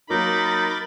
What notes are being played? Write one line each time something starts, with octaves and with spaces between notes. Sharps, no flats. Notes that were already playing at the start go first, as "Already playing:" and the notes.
F#3 A#3 D#4 A#4 B5 D6 G6 A6